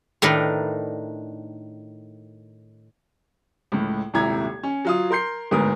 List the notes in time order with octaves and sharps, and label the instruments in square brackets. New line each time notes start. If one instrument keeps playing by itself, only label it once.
[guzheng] A2 D#3 D4 A#4 B4
[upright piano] C#2 A2
D#1 G#1 C3 E4 A#5 G#6
C#4
F#3 F4 D#6
A#4 C6 G6 C7
G1 D2 G#2 B3 A#4 D#6